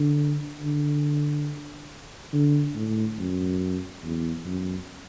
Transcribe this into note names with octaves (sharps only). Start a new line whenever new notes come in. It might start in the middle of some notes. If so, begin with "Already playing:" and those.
Already playing: D3
D3
D3
A2
F#2
E2
F#2